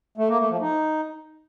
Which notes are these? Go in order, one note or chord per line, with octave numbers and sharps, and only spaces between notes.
A3
A#3
A3
F3
D#4